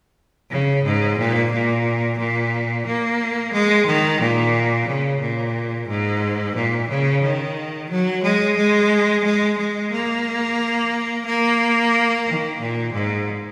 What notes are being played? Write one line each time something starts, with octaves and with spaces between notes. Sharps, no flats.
C#3
G#2
A#2
A#2
A#2
A#3
G#3
D#3
A#2
C#3
A#2
G#2
A#2
C#3
D#3
F#3
G#3
G#3
G#3
G#3
A#3
A#3
D#3
A#2
G#2